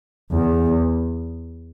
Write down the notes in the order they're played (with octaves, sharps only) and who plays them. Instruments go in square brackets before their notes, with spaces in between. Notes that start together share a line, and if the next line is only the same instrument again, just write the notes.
[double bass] E2